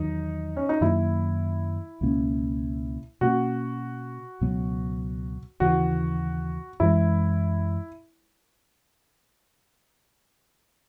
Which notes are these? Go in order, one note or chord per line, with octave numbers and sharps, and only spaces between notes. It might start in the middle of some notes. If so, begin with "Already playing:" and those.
Already playing: E2 D#3 F#3 D#4
C#4
D#4
F#2 D#3 F#3 A#3 E4
C#2 B2 A#3 C#4
B2 A#3 C#4 F#4
C#2 B2 F#3 B3
D#2 C#3 E3 F#4
F#2 E3 G#3 E4